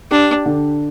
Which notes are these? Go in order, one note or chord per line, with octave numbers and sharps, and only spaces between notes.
D4 G4
D3